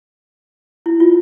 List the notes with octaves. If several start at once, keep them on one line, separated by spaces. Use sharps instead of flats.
E4
F4